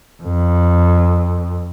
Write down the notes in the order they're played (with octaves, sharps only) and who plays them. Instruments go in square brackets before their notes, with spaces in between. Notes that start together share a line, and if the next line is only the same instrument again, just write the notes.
[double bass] F2